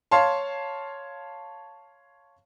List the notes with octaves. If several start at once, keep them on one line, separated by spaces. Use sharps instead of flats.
C#5 F5 A5 C6